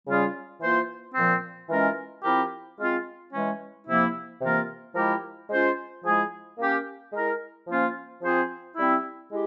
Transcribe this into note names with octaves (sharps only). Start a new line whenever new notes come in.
C#3 G3 C#4 F4 G#4
E3 A#3 F4 C5
A#2 F3 C4
E3 G#3 C#4 F4 A#4
F3 C4 E4 G4 A#4
G#3 C4 F4
E3 G#3 C#4
C3 F3 A#3 E4
C3 E3 A#3 F4 A#4
F3 G#3 E4 G4 A#4
G#3 C#4 F4 C5
F3 G#3 E4 G#4
A#3 C#4 G4 A#4
G#3 E4 A#4
F3 A#3 C#4 F4 C5
F3 C4 F4 G#4 C5
G3 C4 E4
G#3 E4 G4